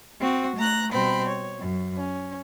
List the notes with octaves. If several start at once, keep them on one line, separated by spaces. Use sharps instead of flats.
C4 F#4
A3 A#5 F#6
B2 G3 C4 B5
C#5
F#2
C#4